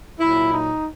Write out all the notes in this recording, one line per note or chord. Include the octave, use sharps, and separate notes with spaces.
A#2 F#3 E4
D#4